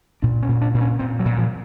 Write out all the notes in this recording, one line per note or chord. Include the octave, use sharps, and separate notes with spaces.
A#2 D4
C#4
A#2
D4
A#2
C#4
A#2 C4
F#3
A#2
F3